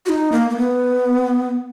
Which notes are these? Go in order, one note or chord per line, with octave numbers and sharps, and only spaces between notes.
F#4
D#4
A#3
A#3
B3